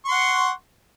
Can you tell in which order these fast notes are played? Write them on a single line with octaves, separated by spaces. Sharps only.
C#6 C6 F#5